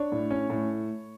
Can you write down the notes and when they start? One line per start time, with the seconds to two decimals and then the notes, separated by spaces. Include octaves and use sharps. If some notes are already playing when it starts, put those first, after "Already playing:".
Already playing: D4 C#5
0.12 A2
0.31 C#4
0.50 A2